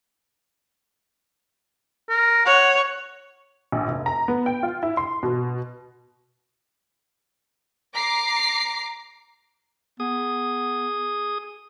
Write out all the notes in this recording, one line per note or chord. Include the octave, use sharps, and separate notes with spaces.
A#4
C#5 F#5
A#1
F1
A#5
B3
G5
F4
E4
C6
B2
A#5 D6 C7
B3 G#4 D#6